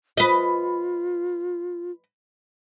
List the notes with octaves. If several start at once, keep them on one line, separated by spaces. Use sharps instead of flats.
F4 B4 D#5